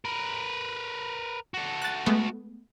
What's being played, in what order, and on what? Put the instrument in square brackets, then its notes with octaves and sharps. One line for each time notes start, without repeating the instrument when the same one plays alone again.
[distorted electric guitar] A#4 B4
F#4 A4
[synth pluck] F#6 A6
G#3 A3 B3